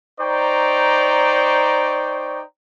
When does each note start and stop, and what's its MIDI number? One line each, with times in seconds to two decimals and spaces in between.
0.21 2.42 63
0.21 2.42 72
0.21 2.42 74
0.21 2.42 79
0.21 2.42 82
0.21 2.42 85